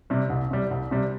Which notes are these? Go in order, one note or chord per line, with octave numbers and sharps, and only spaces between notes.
C3 G3
C2
C3 G3
C2
C3 G3